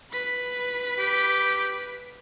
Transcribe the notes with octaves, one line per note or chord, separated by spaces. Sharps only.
B4 B6
G4